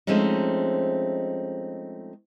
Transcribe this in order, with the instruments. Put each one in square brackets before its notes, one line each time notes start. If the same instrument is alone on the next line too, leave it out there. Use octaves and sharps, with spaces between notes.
[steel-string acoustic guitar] F3 G#3 A3 C4 C#4 D#4